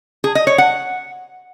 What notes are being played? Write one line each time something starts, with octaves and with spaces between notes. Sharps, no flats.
G#4
D#5
C#5
F#5